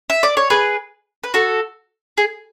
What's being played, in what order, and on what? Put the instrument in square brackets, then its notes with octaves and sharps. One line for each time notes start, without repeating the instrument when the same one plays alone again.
[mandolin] E5
D5
C#5
G#4 B4
B4
F#4 A4
G#4